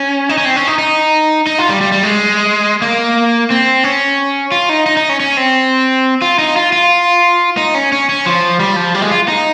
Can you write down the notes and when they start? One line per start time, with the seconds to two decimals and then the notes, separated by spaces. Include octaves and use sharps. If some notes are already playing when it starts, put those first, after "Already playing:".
Already playing: C#4
0.29 D#4
0.38 C#4
0.45 C4
0.56 C#4
0.67 D#4
0.79 D#4
1.47 D#4
1.58 F4
1.69 G3
1.81 G3
1.92 G3
2.03 G#3
2.82 A#3
3.50 C4
3.84 C#4
4.52 F4
4.69 D#4
4.86 D#4
4.97 D#4
5.09 C#4
5.20 C#4
5.37 C4
6.22 F4
6.39 D#4
6.56 F4
6.73 F4
7.57 D#4
7.75 C#4
7.92 C#4
8.09 C#4
8.26 F3
8.60 G3
8.76 F3
8.94 G3
9.02 G#3
9.11 F4
9.28 D#4